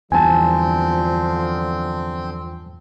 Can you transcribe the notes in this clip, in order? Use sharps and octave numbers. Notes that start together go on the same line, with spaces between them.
E2 G2 D3 F3 C4 G#5 A5